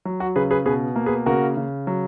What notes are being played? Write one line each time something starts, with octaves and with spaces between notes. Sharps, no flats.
F#3
F#4
C#3 G#4 B4
G#4 B4
B2 G#4 B4
A#3
G#4 B4
C#3 F#4 A#4
C#3
F#3